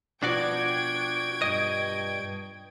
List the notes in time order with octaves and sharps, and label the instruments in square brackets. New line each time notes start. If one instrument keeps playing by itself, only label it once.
[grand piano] B2 F3 [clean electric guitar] D4 F#4 D5 [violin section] G5 G#6 D7
[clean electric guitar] G2 D#5